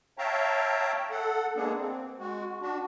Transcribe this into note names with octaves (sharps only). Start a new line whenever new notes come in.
C#5 E5 F5 G5 A5 A#5
A4 F#5
G#3 A#3 B3 D4 G#4
C4
G#3 F#4
D4 F#4